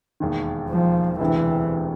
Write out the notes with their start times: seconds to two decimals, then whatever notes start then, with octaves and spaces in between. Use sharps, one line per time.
0.20 E1 D#2 D#3
0.70 F3
1.20 E1 D2 C3 E3